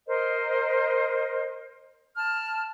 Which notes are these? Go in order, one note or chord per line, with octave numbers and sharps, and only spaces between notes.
A#4 C5 D#5
A5 F6